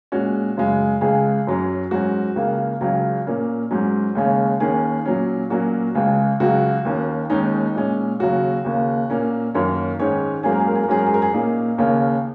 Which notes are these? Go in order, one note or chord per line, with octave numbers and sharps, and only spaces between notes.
A#2 G#3 C#4 F#4
F#2 C#3 G#3
C#2 C#3 G#3 G#4
F#2 F#3 C#4
G#2 F#3 C#4 F#4
C#2 C#3 A#3
C#2 C#3 F#3 C#4
A#2 A#3 C#4
G#2 F#3 C#4
D#2 C#3 G#3 C#4
D#2 D#3 A#3 C#4 G#4
A#2 F#3 C#4
A#2 F#3 A#3 C#4 F#4
C#2 C#3 G#3
C#2 C#3 F#3 F#4
D#2 D#3 A#3 C#4
D#2 D#3 G#3 C#4 D#4
A#2 G#3 C#4
D#2 C#3 F#3 F#4
D#2 C#3 A#3
A#2 A#3 C#4
F#2 D#3 A#3 C#4
G#2 D#3 G#3 C#4 C#5
G#2 F#3 A#3 C#4 G#4
A#4
G#4
A#4
G#4
A#4
G#2 F#3 C#4 G#4
A#4
G#4
A#4
G#4
A#2 A#3 C#4 D#4
D#2 C#3 A#3 C#4